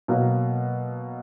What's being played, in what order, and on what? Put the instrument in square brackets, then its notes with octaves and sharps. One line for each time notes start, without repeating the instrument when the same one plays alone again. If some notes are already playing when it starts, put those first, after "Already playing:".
[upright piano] B2 F#3 A#3